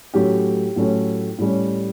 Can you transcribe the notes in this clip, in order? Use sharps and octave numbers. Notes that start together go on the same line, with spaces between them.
A2 F#3 A3 C#4 G4
A2 F#3 A3 C#4
A2 G3 C#4